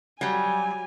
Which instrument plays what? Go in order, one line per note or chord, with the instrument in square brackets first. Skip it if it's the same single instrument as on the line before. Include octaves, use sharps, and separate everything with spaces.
[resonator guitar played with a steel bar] F#3 G3 [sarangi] G#5